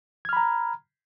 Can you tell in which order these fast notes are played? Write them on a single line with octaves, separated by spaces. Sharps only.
G#6 F6 B5 A#5